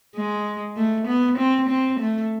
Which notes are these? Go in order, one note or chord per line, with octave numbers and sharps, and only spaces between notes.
G#3
A3
B3
C4
C4
A3